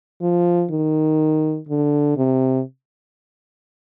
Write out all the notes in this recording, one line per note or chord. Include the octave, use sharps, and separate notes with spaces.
F3
D#3
D3
C3